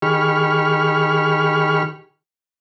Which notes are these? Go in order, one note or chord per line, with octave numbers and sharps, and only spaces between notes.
D#3 G4 G#4 B5 C#6 F6